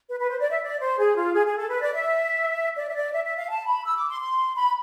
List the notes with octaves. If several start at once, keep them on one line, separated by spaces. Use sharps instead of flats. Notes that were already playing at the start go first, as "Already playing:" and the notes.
B4
B4
C5
D5
E5
D5
C5
G#4
F4
G#4
G#4
A4
B4
D5
E5
D5
E5
D5
E5
E5
F5
A5
B5
E6
D6
C6
C6
B5